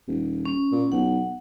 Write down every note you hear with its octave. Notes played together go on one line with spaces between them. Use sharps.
D#1
C#4
A#2
B1 F#5